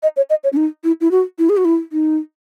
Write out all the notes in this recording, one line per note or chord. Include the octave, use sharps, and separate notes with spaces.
D#5
C#5
D#5
C#5
C#4
D#4
E4
E4
F#4
E4
G#4
F#4
E4
D#4